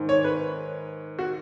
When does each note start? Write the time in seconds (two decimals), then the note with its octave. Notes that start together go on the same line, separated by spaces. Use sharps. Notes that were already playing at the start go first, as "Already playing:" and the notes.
Already playing: G#2 D#3
0.09 C#5
0.24 B4
1.19 F#4